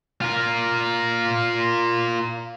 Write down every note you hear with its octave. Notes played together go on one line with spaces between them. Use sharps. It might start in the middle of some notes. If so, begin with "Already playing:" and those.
F4 A#4